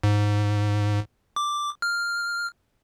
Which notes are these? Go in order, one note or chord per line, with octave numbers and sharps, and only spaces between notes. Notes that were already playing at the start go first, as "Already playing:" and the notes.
G#2
D6
F6